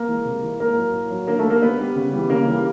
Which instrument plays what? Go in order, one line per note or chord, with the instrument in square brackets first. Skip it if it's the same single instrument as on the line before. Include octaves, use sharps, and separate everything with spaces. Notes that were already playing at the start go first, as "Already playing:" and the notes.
Already playing: [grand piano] A#3 A#4
E3 G#3
C3
E3 G#3
A2 A#3 A#4
F#3
A2
F#3
D3 A#3 A#4
A3 A4
G3 A#3 A#4
D3 B3 B4
G3
C#3
E3 G3
C#3 A#3 A#4
E3
G3